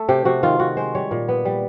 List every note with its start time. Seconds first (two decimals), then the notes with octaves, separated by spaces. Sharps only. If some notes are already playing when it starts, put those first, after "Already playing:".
Already playing: A3 A4
0.09 C3 G4
0.25 C3 F#4
0.43 D#3 F4
0.59 D#3 F#4
0.77 G#3 C5
0.95 G3 C#5
1.11 A#2
1.28 B3
1.45 G3